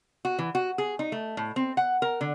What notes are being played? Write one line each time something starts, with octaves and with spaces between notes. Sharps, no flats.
F#4
E3
F#4
G#4
D#4
A3
A2
C4
F#5
A#4
D3